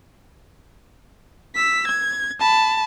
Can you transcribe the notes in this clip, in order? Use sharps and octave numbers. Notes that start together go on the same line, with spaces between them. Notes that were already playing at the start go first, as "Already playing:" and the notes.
E6 B6
G#6
A5 B5